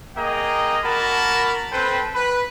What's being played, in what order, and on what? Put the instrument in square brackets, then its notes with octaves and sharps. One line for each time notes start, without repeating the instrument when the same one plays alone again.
[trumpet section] A#3 G#4 D#5 G5 A#5
A#3 F#4 A#4 A5 B5
C4 A4 B4 C5 G5
B4